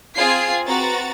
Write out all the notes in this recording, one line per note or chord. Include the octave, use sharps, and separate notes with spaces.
C4 F4 G#4 G#6 C7
C4 F#4 B4 A#5 A6